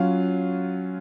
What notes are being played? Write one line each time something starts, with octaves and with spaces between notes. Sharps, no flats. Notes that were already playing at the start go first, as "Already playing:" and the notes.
Already playing: F#3 C#4 F4 F5